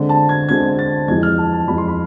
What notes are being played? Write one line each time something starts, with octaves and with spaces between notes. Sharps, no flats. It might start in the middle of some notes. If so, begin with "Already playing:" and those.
Already playing: D3 G#3 C4
A5
G#6
D3 G#3 C4 G#6
A6
F2 E3 G#3 G#6
F6
A5
A5
F2 E3 G#3 B5
C6
B5